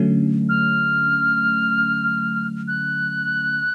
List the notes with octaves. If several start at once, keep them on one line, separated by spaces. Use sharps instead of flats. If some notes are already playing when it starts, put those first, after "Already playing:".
Already playing: D3 F#3 A3 C#4
F6
F#6